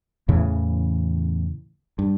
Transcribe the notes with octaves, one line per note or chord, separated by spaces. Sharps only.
E2 A2 C#3 E3
G2